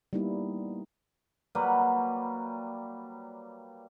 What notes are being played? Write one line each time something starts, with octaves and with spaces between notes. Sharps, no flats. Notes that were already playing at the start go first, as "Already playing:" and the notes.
G3 A#3 B3 D#4 E4
F#3 G3 A#3 B4